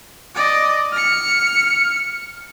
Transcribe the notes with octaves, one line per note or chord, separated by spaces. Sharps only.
D5 D#5
F6 C#7